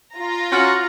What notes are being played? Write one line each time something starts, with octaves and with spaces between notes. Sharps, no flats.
F4 A#5
C#4 F#4 F#5 C6 F6 A6